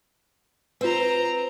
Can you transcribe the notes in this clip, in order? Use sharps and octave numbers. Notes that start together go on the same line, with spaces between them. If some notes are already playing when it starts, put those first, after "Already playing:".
C4 F4 B4 C5 A#5